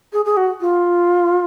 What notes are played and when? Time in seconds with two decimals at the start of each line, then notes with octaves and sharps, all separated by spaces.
0.13 G#4
0.25 G#4
0.37 F#4
0.61 F4